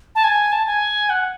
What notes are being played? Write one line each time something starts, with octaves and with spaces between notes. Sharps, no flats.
A5
G#5
A5
G#5
F#5